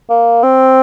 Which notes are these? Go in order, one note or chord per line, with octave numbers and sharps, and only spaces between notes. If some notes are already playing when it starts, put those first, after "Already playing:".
A#3
C4